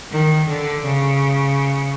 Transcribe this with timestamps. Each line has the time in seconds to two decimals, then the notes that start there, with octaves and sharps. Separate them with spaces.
0.11 D#3
0.48 D3
0.85 C#3